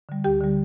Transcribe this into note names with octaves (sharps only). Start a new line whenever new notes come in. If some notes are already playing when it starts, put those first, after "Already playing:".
D3 G3
D2 G4 G5
D3 G3